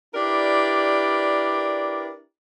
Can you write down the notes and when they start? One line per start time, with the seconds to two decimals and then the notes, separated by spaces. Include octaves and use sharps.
0.15 D4 E4 G4 A#4 B4 D5